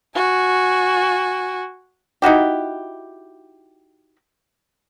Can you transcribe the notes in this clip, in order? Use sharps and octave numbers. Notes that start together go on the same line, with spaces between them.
F#4 G#5
D#4 E4 F#4 G4